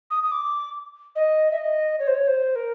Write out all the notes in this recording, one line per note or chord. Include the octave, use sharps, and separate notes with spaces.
D#6
D#6
D6
D#5
E5
D#5
C#5
C5
C#5
C5
A#4